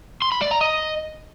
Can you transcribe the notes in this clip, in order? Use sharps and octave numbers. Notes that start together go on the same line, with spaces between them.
C6
B5
D5
A#5
D#5